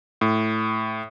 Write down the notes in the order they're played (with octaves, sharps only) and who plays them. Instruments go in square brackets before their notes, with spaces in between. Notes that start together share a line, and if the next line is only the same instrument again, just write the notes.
[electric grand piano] A2